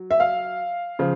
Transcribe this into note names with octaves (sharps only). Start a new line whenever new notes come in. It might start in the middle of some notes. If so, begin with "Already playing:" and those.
Already playing: F#3
E5
F5
C#3 F3